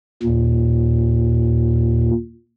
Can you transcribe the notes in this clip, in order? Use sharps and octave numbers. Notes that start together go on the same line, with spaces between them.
D#2 A#2